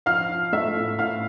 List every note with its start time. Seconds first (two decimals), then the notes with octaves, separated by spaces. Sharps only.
0.06 F3 F5 F6
0.30 F3
0.53 A3 E5 E6
0.76 A2
0.99 A2 F5 F6